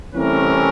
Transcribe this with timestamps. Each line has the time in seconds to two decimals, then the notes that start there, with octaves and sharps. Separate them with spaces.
0.14 C2 C3 E3 A3 C#4 A#4